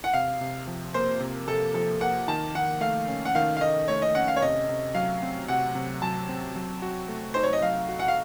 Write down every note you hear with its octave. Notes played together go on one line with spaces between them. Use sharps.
F#5
C3 F5
C3
F3
A#3 C5
C3
C3 A4
F3 A4
A#3 F#5
D#3 A5
D#3 F#5
A3 F5
C#4
F#5
D#3 F5
F5
D#3 D#5
A3 C#5
D#5
C#4 F#5
F5
C#5
C3 D#5
C3
F#3 F5
C4
C3 F#5
C3
F#3 A5
C4
F#3
F#4
A3
D#4 C5
C#5
D#5
F#3 F5
F#4
F#5
F5